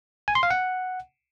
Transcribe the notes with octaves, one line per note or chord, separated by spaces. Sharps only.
G#5
C6
F5
F#5